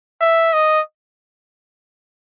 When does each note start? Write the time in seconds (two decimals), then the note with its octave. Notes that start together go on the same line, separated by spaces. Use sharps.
0.21 E5
0.53 D#5